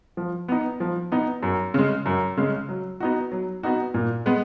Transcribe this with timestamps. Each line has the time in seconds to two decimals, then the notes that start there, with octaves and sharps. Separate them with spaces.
0.17 F3
0.48 B3 D#4
0.80 F3
1.12 B3 D#4
1.43 F#2
1.74 C#3 G#3
2.06 F#2
2.37 C#3 G#3
2.69 F#3
3.00 B3 D#4 F#4
3.32 F#3
3.63 B3 D#4 F#4
3.94 A#2
4.26 G#3 B3